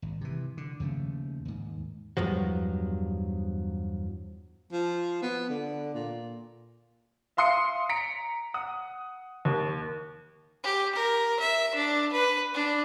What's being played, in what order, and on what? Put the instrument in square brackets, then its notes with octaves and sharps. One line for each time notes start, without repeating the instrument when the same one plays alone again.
[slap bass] G#1
C3 E3
D3
D#2 C#3 F3 A3
D#2 G#2
[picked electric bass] E2 G2 F3 F#3
[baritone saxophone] F3
B3
D3
A#2
[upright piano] E5 F5 C6 D#6 C7 C#7
A#5 B6 C#7 D7
F#5 D#6
D#2
[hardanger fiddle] G4
A#4
E5
D4
B4
D4